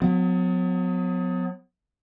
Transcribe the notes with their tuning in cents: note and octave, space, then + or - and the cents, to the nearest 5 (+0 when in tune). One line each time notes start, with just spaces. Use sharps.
F#3 -35 B3 +35